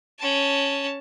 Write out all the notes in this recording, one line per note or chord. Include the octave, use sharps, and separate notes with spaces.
C#4 A5